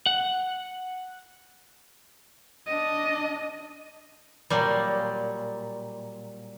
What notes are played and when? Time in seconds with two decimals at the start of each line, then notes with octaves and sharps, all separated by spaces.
0.06 F#5
2.67 D4 D#5
4.50 A#2 F#3 G3